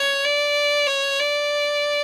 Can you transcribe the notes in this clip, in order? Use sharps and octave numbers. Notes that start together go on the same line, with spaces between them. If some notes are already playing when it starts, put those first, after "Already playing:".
Already playing: C#5
D5
C#5
D5